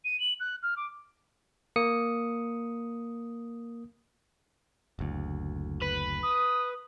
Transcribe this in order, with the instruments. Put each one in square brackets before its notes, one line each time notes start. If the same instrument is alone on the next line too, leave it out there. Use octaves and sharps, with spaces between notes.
[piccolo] D#7
F#7
F#6
F6
D6
[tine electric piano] A#3 D#6 C#7
[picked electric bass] F#1 D2
[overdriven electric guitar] B4
[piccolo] D#6